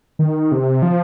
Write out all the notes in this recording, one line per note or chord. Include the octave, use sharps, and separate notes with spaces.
D#3
C3
F3